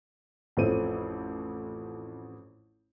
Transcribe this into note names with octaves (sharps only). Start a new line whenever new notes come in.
A1 F2 A4 C5 D#7